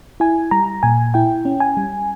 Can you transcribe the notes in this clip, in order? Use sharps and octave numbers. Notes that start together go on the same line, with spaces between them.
E4 G#5
G3 A#5
A#2 G#5
E4 G5
C#4
G#5
G3